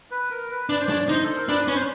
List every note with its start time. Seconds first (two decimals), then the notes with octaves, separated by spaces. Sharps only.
0.11 B4
0.31 A#4
0.51 B4
0.69 D4 B4
0.80 C5
0.89 D4 C#5
1.00 D5
1.09 D#4 C5
1.24 A4
1.36 A#4
1.49 D4 B4
1.68 C#4 B4
1.75 C5